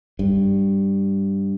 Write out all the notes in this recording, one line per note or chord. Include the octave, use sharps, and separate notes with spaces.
G2